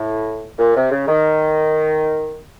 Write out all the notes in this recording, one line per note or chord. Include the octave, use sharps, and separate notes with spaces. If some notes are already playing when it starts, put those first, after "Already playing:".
Already playing: A2
A#2
C3
C#3
D#3